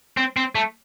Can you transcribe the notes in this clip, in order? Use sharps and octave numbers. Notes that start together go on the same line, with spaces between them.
C4
C4
A3